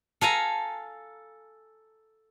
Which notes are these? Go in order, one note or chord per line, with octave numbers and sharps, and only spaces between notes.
A4 F5 G#5 A#5